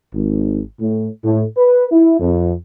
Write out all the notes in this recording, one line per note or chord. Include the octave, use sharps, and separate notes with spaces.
G#1
A2
A2
B4
E4
F2